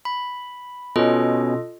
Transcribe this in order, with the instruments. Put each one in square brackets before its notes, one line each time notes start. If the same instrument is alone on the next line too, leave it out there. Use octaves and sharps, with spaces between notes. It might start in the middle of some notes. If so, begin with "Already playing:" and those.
[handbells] B5
[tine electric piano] B2 C#4 [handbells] F4 A4 D#5